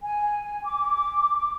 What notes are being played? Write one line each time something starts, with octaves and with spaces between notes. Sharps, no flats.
G#5
D6